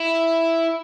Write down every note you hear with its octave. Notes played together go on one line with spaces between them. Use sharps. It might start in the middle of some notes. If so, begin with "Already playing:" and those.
Already playing: E4